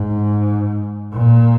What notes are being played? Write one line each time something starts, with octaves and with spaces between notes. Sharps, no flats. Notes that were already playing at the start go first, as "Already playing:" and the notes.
Already playing: G#2
A#2